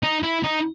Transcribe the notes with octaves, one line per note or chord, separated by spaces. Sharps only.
D#4
E4
D#4